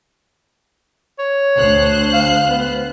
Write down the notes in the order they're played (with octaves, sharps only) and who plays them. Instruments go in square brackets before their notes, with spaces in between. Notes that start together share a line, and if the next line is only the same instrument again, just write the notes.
[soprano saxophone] C#5
[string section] D2 C5 F#6
[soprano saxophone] F5
B3